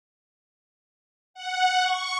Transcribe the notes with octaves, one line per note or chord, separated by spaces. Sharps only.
F#5
C#6